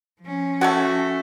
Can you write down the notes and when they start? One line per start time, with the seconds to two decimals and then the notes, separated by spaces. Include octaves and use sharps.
0.22 F3 C#4
0.61 A3 F#4 C#5 F#5